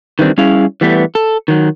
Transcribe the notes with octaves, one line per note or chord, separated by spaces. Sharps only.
D#3 E3 G3 C4 D4
G3 C#4 E4 G#4 F5
E3 G3 A3 B3
A4
D#3 F#3